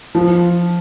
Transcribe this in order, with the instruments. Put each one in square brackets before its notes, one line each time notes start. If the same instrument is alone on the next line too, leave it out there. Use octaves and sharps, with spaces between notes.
[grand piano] F3